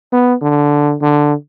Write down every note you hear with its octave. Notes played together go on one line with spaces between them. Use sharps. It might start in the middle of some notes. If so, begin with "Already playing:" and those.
B3
D3
D3